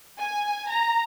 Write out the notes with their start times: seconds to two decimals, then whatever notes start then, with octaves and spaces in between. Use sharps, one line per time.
0.19 G#5
0.70 A#5